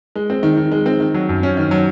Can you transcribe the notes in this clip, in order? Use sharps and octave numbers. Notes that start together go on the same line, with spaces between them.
G#3
C4
D#3
D#3
G#3
C4
D#3
F#3
F#2
C#4
D#3
F#3